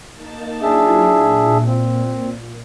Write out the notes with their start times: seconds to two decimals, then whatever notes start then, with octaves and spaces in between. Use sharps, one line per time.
0.13 A#3 D#4 A5
0.63 F#3 D4 E4 F4 G#4 E5
1.12 A#2
1.66 C4